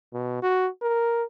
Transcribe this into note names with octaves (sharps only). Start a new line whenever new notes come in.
B2
F#4
A#4